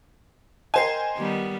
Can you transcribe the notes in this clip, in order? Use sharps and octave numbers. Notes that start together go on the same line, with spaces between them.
A#4 C5 D#5 G5 G#5 C7
D#3 G3 B3